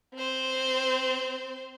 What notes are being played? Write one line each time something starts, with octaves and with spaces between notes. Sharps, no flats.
C4 C5